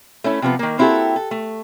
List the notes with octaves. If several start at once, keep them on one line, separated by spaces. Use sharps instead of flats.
A3 C#4 E4
C3 F3 B3
D#3 A#3
A#3 C4 E4 F#4 G4 A4
A4
A3